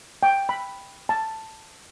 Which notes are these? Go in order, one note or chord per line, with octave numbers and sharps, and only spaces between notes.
G5
B5
A5